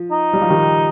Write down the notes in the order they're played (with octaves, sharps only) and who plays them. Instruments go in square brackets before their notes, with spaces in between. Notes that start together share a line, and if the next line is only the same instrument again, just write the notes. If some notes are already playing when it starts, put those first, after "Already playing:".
Already playing: [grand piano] F3
[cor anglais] D#4
[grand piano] G3
F3
D#3 G3